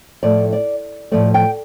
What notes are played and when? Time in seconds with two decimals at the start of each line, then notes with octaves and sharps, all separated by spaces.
0.23 A2 F3 A3 D5
0.53 D5
1.12 A2 F3 A3 D5
1.34 G5